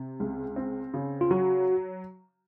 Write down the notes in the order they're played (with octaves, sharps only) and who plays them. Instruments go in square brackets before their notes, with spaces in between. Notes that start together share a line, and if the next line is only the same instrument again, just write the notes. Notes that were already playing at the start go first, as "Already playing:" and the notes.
Already playing: [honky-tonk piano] C3
C#2
C4
C#3
[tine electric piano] F4
[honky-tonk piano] F#3 [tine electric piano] F#4